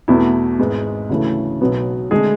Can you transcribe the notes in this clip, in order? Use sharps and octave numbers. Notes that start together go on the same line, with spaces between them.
E2 B2 A3 E4
G#1 G#2 G#3 B3
D2 C#3 E3 A3
B1 B2 F#3 B3
D3 G#3 A3 G#4